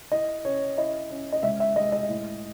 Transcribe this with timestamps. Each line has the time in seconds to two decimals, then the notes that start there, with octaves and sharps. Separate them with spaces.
0.12 E4 D#5
0.45 C#4 C#5
0.77 E4 D#5
1.10 C#4
1.33 D#5
1.43 C#2 E5
1.60 E5
1.76 G#3 D#5
1.92 D#5
2.09 A2